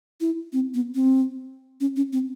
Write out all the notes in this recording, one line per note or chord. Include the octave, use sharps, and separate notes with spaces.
E4
C4
B3
C4
C#4
C#4
C4